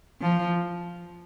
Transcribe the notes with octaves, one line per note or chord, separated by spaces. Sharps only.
F3